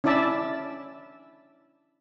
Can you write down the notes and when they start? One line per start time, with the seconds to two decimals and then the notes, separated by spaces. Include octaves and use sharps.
0.04 C#4 D4 E4 D5 E5 A5